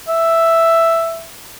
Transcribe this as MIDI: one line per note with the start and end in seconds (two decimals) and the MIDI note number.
0.08 1.25 76